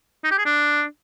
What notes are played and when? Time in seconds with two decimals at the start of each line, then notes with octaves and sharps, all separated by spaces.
0.24 D#4
0.31 G4
0.38 G#4
0.45 D4